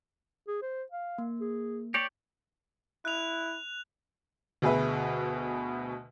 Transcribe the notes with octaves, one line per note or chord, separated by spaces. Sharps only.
G#4
C5
F5
A#3
G#4
G4 C#5 D5 G6
E4 F#6 F7
D2 B2 G#4 B4 E5